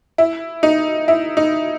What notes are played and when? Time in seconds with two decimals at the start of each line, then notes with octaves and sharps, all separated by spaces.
0.18 E4
0.63 D#4
1.08 E4
1.37 D#4